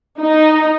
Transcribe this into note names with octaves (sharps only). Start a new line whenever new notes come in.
D#4